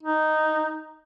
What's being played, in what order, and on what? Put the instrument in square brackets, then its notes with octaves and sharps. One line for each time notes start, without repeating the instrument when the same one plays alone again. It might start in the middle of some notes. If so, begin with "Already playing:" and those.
[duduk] D#4